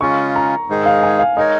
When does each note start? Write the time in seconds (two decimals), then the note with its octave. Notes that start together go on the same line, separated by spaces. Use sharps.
0.01 C#3 G#3 C#4 F4 C#6
0.36 A#5
0.69 G#2 D#3 G#3 D#4 G#4
0.86 F5
1.03 G#5
1.19 F5
1.36 G#3 D#4 A#4 C#5 D#5